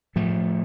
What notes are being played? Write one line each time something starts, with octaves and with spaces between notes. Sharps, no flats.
A2 F3 A3